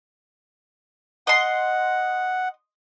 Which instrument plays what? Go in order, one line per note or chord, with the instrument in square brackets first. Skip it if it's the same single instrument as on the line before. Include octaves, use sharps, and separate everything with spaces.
[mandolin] D#5 C6 [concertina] F#5